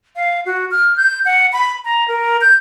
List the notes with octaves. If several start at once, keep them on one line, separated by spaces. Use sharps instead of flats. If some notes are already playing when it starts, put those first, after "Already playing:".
F5
F#4
F6
G6
F#5
B5
A#5
A#4
G6